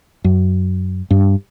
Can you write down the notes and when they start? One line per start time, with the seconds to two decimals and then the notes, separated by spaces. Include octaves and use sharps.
0.24 F#2
1.11 G2